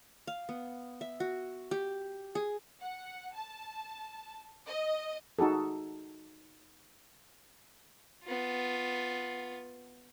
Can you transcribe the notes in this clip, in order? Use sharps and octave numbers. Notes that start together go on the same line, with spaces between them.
F5
B3
E5
F#4
G4
G#4
F#5
A5
D#5
D#4 F#4 G#4 A4
B3 F4